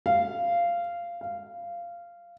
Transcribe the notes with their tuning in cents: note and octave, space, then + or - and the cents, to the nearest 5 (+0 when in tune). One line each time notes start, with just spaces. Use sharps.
F5 -15
F5 -15